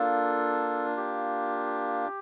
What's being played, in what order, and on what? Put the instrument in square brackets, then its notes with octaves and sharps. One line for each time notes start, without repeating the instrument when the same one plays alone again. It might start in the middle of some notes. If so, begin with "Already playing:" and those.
Already playing: [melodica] A#3 D4 F4 A4
G4